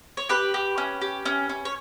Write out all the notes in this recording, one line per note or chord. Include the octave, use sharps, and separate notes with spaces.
C#5
G4 B4
G4
C#4
G4
C#4
C#4
C#5